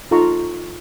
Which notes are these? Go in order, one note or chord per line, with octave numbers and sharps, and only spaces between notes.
D#4 F4 A4 A#5 C6 C#6